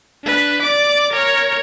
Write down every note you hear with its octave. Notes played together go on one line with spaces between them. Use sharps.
D4 B4
D5 D6
A#4 C#5